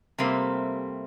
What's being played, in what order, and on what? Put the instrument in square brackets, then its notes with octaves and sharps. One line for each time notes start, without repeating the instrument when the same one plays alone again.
[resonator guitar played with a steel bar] C3 G3 A3 A#3 C4